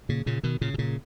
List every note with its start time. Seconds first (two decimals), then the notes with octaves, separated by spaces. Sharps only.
0.09 A#2 C#3
0.26 A#2 C#3
0.43 B2 D#3
0.61 A#2 C#3
0.74 B2
0.78 A#2 C#3